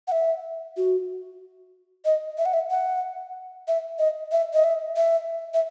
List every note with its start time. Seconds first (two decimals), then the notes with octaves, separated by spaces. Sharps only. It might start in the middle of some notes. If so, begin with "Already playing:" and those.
0.08 F#5
0.12 E5
0.77 F#4
2.05 D#5
2.38 E5
2.46 F#5
2.54 E5
2.70 F#5
3.68 E5
3.99 D#5
4.32 E5
4.53 D#5
4.64 E5
4.97 E5
5.54 E5